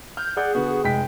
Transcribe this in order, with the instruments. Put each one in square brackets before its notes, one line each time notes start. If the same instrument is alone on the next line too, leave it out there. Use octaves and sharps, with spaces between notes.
[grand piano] F6 [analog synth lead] G6
[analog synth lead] G#4 [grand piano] D5 G6 [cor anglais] F#5
[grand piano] D3 B3 [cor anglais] F#4
[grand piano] F1 G#3 B6 [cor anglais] G5